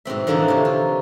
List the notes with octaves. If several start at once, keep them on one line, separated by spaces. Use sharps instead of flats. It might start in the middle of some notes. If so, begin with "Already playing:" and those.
G#2 B2 C4 E5
D3 E3 F3 A#3 D4 D#4
C3 C#5
F4